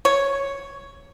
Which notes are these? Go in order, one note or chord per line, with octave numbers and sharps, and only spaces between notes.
C#5